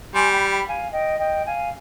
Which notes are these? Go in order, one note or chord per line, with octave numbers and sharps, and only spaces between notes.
G3 G#5 C6
G5 B5
G5 B5
F5 G#5
D#5 G5
D#5 G5
F5 G#5